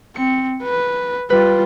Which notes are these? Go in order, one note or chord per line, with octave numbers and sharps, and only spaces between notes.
C4 C#7
B4
G3 F4 B4